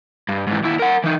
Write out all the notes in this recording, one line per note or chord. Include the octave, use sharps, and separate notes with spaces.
G2
G#2 E3
D#2 E4
A#4 F#5
E3 D#4